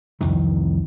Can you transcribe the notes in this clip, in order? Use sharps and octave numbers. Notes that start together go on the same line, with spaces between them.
C2 F2 D#3 E3